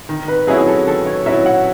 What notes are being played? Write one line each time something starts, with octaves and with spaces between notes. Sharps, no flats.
D#3
B4
F#3 C#4 E4 G#4
G#4
A4
D#3 A4
C#5
F#3 C#4 E4 E5
F#5